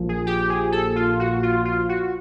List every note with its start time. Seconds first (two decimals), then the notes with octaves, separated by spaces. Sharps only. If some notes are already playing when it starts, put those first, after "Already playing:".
Already playing: A#1 A#2 F3
0.09 G#4
0.26 G4
0.50 G#4
0.72 A4
0.96 F4
1.19 F#4
1.43 F4
1.65 F4
1.89 F#4